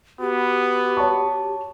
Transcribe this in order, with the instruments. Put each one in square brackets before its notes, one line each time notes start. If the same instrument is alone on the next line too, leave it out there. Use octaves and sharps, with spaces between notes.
[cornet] B3 [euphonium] F#4 [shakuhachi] G4
[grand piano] C#5 A5 C#6